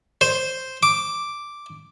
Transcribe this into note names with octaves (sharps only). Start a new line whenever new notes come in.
C5
D6